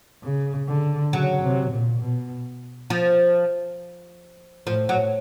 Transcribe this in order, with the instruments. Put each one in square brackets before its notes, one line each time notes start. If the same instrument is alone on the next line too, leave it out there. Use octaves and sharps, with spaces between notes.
[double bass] C#3
D3
[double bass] C#3 [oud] F#3
[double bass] C3
A#2
B2
[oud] F3
[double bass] A2 [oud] F3
[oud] F#3